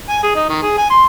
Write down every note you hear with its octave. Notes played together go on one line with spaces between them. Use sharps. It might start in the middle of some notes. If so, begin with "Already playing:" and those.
G#5
G#4
D#4
D#3
G#4
G#5
C6